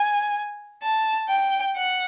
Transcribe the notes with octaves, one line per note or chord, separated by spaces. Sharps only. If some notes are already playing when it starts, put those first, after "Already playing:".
Already playing: G#5
A5
G5
F#5